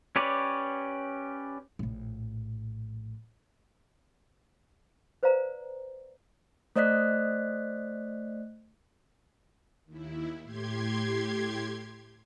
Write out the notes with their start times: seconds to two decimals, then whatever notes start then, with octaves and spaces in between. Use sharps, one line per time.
0.16 C#4 G4 B4 C#5 D5
1.79 A#1 A2
5.23 B4 C5 D5 F5 A#5
6.76 A3 C5 D5 D#5 F#6 B6
9.86 D#2 E4
10.43 A2 G4 C6 G#6